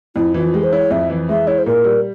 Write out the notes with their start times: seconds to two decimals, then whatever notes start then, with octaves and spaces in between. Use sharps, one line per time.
0.16 F2 E4
0.34 E3 F4
0.54 G#3 G4
0.63 C5
0.72 E4 C#5
0.91 F2 E5
1.10 E3
1.29 G#3 E5
1.47 E4 C#5
1.58 C5
1.66 A#2 A#4
1.84 G3